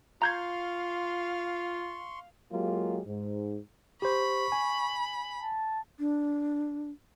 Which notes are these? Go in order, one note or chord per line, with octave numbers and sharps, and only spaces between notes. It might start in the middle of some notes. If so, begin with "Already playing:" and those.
F4 F5 A#5 C6 C#6 G6 G#6
F#3 G#3 A#3 F4 G4
G#2
G4 C5 B5 C#6
G#5
A5
D4